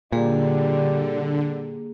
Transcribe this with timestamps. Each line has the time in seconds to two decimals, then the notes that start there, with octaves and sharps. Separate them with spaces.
0.12 A#2 D3 G3 A#3 G#4